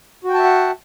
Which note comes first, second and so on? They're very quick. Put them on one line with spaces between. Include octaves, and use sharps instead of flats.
F#4 G5 A5 E5 F#5